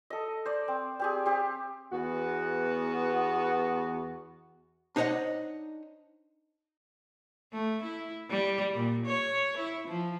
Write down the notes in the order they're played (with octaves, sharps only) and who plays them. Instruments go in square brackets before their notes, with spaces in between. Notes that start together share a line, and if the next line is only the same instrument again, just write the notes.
[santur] A4 D#5
C5 D5
C4
C4 G4 G#4
C4 G4
[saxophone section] E2 B3 F#4
[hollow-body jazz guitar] D4 D#4 C5 C#5 D#5 F#5
[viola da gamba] A3
E4
G3
A#2
C#5
E4
F3